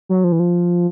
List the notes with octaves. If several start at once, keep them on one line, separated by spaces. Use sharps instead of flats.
F#3
F3
E3
F3